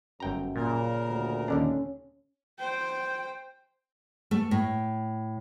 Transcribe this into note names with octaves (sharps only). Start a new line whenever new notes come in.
G1 F#2 G5 A#5
A#2 C#3 A#4
D2
D#2 D3 C#4 D4
C5 G5
A3
A2